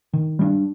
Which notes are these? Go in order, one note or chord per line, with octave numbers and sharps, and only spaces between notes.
D#3
G3 B3 D4